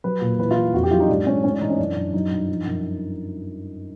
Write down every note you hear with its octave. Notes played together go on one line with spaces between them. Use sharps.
F#3 B4
A#2
E3 B4
F4
E3
F2 F#4
G4
F#3 F4
D#4
G#2 D4
G#2 C#4
A2 C#4
D4
E3 D#4
C#4
F#2 D4
F#2
F#3 D#4
G2
F3
F#2